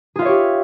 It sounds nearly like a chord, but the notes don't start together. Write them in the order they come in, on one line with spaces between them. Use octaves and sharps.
G#4 F4 E5 C#5 G4